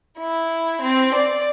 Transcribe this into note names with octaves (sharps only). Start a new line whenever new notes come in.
E4
C4
D5